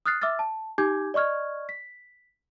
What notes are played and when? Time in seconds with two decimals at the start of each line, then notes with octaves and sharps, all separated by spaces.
0.06 D#6 F6 F#6 A6 C7
0.22 E5 D6 E6 F6 A6
0.39 A5
0.78 D#4 G4 G#5 D6 G6 G#6
1.14 D5 D#5 C#6 F6 G#6
1.69 B6